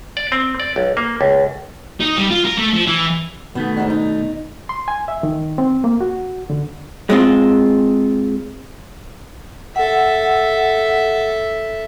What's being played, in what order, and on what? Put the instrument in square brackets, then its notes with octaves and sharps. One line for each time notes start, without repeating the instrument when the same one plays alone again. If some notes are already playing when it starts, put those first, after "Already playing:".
[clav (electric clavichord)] D5
C4
D5
B1
A#3
C#2
[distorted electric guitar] D#4
G3
F4
A#4
A3
F3
E3
[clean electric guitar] B2 D#3 A3 [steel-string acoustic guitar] B3
[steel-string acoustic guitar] G#2 G#3 D4
D#4
[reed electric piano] C6
G#5
E5
D#3
C4
A#3
F#4
D3
[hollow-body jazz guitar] G#3 C4 F4
[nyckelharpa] A4 E5 [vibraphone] F#5